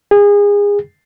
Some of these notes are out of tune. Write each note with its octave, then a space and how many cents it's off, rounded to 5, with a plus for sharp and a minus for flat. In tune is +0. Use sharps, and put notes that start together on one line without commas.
G#4 -30